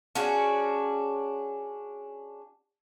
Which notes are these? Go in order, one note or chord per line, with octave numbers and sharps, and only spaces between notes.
C#4 D4 F#4 G#4